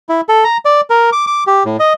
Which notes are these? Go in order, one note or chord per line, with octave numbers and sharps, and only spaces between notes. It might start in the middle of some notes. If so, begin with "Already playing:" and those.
E4
A4
A#5
D5
A#4
D6
D6
G4
A2
D#5